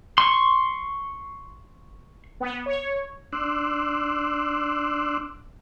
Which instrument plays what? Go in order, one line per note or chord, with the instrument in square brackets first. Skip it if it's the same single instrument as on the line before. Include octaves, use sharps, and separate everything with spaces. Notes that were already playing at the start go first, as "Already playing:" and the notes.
[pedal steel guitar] C6 C#6
[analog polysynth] B3
C#5
[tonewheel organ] D4 C6 D6 E6 F#6